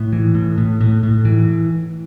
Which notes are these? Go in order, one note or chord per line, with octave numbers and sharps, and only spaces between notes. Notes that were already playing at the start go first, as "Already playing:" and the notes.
Already playing: A2
E3
A2
A2
A2
A2
E3